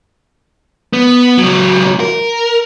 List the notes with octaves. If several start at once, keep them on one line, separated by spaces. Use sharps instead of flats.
B3
C#2 F#3
A#4